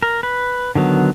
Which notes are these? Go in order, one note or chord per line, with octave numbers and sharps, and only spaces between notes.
A#4
B4
D3 D#3 F#3 B3